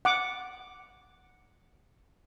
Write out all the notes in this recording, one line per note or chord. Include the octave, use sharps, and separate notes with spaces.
F#5 D6